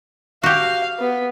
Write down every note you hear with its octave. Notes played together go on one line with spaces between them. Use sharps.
F#4 G4 F5
B3